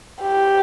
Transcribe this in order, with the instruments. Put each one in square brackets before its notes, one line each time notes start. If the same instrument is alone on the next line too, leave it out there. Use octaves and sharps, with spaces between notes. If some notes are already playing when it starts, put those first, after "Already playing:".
[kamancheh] G4